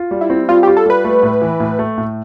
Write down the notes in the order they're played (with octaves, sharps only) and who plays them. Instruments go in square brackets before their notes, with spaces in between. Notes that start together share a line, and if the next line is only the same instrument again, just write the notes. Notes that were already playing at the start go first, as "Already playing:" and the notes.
Already playing: [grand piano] F4
G3
[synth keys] E4
[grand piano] C4
[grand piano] G3 [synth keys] F4
[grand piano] F4 [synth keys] G4
[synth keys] A4
[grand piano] G3 [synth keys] B4
[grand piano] A3
A2
E3
A2
A3
A2